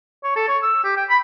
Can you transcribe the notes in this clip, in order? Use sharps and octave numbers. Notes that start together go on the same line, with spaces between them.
C#5
A4
C#5
E6
G4
G5
B5